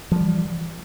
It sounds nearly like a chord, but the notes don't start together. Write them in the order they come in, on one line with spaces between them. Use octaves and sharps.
F3 G3 E3